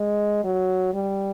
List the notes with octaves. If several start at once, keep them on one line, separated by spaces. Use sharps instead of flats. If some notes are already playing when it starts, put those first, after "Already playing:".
Already playing: G#3
F#3
G3